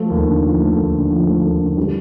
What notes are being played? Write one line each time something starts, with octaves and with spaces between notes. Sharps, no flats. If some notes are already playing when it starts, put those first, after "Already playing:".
Already playing: F3 A3
D#2
D3
F3
A3
D#2
D3
F3
A3
D#2
D3
G3